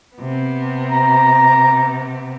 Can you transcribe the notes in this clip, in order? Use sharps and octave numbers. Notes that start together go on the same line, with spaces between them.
C3 B3
A#5